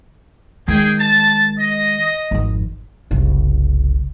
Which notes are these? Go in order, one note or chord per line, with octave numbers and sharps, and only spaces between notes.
D#3 G#3 G#4 G5
A5
D#5
G#1 F2
F#1 C2